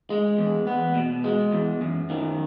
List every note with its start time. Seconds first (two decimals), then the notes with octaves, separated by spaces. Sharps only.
0.10 G#3
0.38 E2
0.67 B3
0.95 B2
1.24 G#3
1.52 E2
1.81 F#2
2.10 D#3